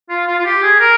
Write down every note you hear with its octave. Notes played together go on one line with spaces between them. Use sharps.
F4
F4
F4
G4
G#4
A#4